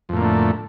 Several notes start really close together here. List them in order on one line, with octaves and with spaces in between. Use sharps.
F2 A2 A#3 D3 A3